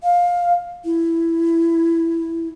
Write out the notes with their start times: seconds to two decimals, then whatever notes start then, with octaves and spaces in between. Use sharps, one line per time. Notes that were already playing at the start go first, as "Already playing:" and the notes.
0.03 F5
0.85 E4